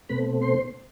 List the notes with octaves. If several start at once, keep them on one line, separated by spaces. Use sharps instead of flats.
B2 A3 C4 B4 B5
C5 C6